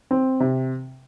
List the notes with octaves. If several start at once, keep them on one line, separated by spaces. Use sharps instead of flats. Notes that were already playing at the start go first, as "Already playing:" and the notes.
C4
C3